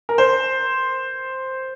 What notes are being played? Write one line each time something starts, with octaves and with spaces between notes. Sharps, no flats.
A#4
C5